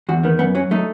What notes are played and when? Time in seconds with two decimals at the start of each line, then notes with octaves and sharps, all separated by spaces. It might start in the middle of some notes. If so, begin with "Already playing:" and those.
0.09 E2 F#4
0.23 D#3 B3
0.39 F#2 B3
0.55 F#3 C#4
0.71 A3 D#4